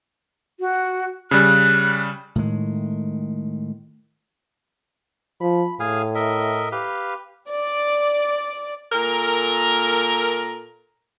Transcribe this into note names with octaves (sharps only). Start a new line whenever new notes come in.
F#4
C#3 G3 F#6
A2 D#3 G#3
F3 B5
A2 G#4 F5 G#5
A#4 D#5 E5
G4 B4 F5
D5
A#2 A4 A#4